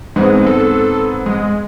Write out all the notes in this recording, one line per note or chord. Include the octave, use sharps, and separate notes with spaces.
G#2 G#3 B3 C4
A4
G#3